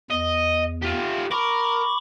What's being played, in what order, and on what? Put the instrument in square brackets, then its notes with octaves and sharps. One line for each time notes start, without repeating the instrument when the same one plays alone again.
[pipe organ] E2 [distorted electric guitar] D#5
[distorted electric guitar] F4 G4
[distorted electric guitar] A#4 [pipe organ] B5 C#6 D6